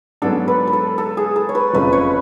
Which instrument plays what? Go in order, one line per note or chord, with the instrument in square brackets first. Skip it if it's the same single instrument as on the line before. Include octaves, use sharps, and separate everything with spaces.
[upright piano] G#2 F#3 B3 D4 [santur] A4
[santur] B4
B4
A4
A4
G#4
A4
C#5
B4
[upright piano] F#1 F2 C#3 F3 [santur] B4
[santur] C#5